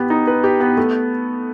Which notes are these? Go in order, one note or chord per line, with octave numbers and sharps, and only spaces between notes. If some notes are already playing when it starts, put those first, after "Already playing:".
Already playing: B3 G4
D#4
B4
G4
B3
A3